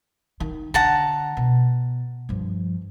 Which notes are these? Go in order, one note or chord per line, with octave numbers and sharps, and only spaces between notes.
D#3
D3 F#5 A5 A#5
B2
G2 F3